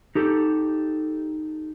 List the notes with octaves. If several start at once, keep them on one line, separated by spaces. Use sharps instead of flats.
D#4 G4 A4